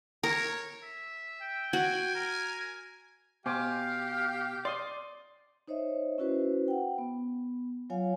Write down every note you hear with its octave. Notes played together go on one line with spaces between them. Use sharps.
A#4 C#5
E5
G5
F#4 G#5
A#4
B2 G4 C5 F5 G#5 D6
D5 C6 D#6
D#4 C5 C#5 D#5 E5
C#4 E4 F#4 B4 C5
F#5 G5
B3
F#3 F4 C#5 F5 G#5